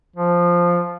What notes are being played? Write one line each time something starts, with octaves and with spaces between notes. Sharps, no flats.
F3